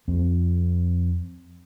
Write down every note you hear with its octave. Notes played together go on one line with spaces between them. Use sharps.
F2 C4